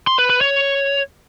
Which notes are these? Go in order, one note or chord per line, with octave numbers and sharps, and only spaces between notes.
C6
B4
B4
C#5